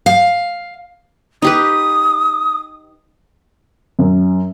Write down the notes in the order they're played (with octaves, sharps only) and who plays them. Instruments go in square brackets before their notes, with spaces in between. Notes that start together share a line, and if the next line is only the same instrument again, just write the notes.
[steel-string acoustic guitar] F5
[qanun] D#4 G4 B4 [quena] D#6
[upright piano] F#2